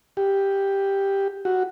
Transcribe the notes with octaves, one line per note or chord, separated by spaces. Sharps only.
G4
F#4